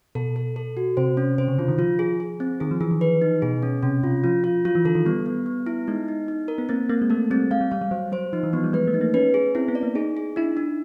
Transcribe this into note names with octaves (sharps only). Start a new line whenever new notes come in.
B2 A4
A4
A4
F#4
C3 C5
C#4
C3 C5
C#3
D3 F4
D#3
F3 F4
G#4
G#4
C4
D#3 G#4
F3
E3 G#4
D#3
B4
D#4
B2 G#4
C#4
C3 C#4
C3 F4
F3 F4
F4
F#3 F4
E3
D3 A4
D#3
G3 B3
B3
B3
E4
G#3 D#4
D#4
D#4
A#4
B3
A#3 C4
A#3 C4
G#3
A3 A4
G3 C4
G#3 F5
G3
G3 F5
G3
F#3 C5
F#3 C5
F3 D#4
E3
F3 B3
G3
G#3 B4
A3
D#4
A#3
C#4 B4
G#4
C4 E4
B3
D5
A#3
D#4 G#4
G#4
D4 E4
D4